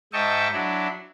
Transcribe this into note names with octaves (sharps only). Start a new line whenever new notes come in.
G#2 D#5 E5 G5 A5 C#6
F#3 D4 E4